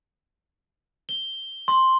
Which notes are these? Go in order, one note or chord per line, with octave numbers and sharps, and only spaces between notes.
G7
C6